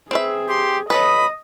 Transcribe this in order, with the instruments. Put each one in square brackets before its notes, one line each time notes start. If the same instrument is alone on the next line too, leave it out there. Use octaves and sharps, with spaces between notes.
[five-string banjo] C4 B4 E5 [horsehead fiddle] G#4
[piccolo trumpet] G4 [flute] C6
[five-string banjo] F#3 A4 B4 [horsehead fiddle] D#5 [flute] B5 [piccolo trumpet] D#6